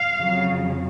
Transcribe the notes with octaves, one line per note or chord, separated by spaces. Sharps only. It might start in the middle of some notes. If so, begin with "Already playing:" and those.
Already playing: F5
F2 C#3 F#3